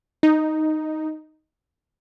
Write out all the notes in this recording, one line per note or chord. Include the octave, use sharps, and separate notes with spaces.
D#4